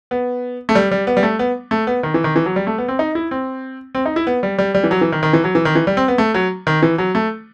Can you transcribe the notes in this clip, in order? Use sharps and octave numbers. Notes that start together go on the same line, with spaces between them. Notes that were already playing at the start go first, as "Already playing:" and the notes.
B3
A3
G3
G3
B3
G3
A3
B3
A3
B3
D#3
E3
D#3
E3
F#3
G3
A3
B3
C4
D#4
E4
C4
C4
D#4
E4
B3
G3
G3
G3
E3
F#3
E3
D#3
D#3
E3
F#3
E3
D#3
E3
G3
C4
B3
A3
F#3
D#3
E3
F#3
A3